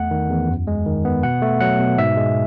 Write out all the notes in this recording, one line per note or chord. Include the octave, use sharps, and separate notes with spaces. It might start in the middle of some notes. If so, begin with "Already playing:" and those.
Already playing: E2 A3 F#5
D#3
E2
F#2
G#3
D#3
B3
B2 F#5
A3
F#3 F#5
B2
G#2 E5
G#3